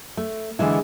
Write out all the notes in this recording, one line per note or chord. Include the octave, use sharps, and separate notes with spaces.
A3
D3 E3 G#3 E4